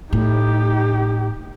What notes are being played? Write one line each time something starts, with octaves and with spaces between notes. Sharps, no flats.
A2 D#4 G4